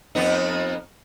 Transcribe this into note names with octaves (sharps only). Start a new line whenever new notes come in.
F2 B3 D#4